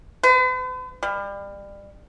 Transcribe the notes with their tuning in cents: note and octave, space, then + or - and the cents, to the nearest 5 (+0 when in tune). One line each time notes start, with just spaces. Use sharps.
B4 +45
G3 +30